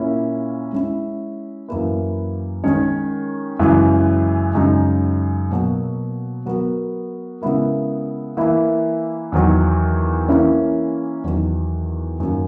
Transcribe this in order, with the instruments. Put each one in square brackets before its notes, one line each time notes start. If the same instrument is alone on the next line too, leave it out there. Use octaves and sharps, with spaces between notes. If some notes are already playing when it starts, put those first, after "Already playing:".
Already playing: [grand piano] A#2 A#3 C#4 E4
G#3 C#4 E4
F#2 E3 A#3 E4 B4
D#3 G#3 C#4 G#4 C#5
F#2 C#3 E3 G#3
F#2 C#3 G#3 D#4
B2 F#3 A#3
F#3 B3 F#4 A#4
C#3 G#3 B3 E4 A#4
E3 A#3 E4
E2 D#3 F#3
E3 A#3 C#4 E4
E2 D#3 F#3
F#2 D#3 A#3